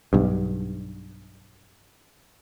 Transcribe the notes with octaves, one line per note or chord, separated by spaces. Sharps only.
B1 G2